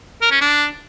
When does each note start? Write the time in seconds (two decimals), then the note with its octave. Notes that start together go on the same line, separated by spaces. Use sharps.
0.22 A#4
0.31 C#4
0.41 D4